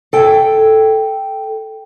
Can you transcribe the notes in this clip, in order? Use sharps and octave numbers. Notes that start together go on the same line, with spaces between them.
A4 G5